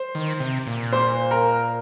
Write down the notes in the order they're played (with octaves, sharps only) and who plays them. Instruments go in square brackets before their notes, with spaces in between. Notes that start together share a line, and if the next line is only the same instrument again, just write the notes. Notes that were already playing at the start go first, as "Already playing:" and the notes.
Already playing: [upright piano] C5
[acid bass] D#3
C3
A#2
[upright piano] C5
A#4